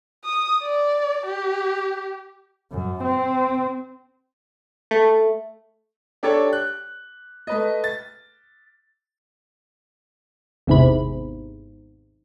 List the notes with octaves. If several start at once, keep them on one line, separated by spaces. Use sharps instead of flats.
D#6
D5
G4
F#2
C4
A3
D4 G4 A4 C#5
F#6
A3 B4 D#5
A6
G#1 E2 G#2 C3 B5